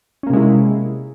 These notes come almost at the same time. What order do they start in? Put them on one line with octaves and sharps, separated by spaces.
C#4 A#3 C3 G#3 E4